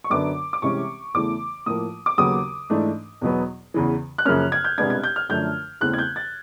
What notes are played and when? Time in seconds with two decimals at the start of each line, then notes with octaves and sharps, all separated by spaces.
0.04 C#6
0.10 F#2 D3 F#3 B3 D4 D6
0.53 D6
0.62 C2 C3 E3 G#3 C#4 C#6
1.14 E2 C#3 E3 A3 D6
1.66 A2 F3 A#3 D#6
2.06 D6
2.18 D#2 C#3 F#3 B3 D#6
2.70 G#2 E3 A3 D4
3.21 E2 B2 F#3 B3
3.74 E2 C#3 E3
4.18 F#6
4.25 F#2 C#3 F3 A#3 C#4 F6
4.52 G#6
4.64 G6
4.78 C2 B2 G#3 B3 D4 G#6
4.90 G#6
5.03 G6
5.16 F6
5.29 F#2 D3 F3 A3 D4 G6
5.81 E2 C#3 E3 A3 C4 F#6
5.93 G#6
5.98 G6
6.16 A6